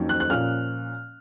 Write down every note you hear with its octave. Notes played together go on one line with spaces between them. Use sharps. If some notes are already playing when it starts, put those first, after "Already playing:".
Already playing: F2 D#3 F#3 A#3 C#4
F#6
F#6
A#2 F3 A#3 C#4 F6